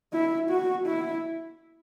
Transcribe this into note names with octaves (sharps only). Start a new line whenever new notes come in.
E4
F#4
E4